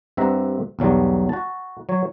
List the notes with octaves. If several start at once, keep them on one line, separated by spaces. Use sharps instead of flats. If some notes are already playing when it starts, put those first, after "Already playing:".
G2 C4 E5 F#5 A#5
B1 E2 F#3 G3
F#4 A5
F#3 C#5